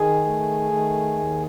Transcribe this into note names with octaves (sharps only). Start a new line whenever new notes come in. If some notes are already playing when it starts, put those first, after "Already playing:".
Already playing: D#3 G#4
A3
D#3
D#2